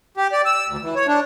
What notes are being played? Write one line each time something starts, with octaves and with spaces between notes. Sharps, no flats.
G4
D5
E6
D2
E3
C#5
D4